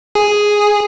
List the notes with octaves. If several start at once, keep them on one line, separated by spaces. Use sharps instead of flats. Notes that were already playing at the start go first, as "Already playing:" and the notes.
G#4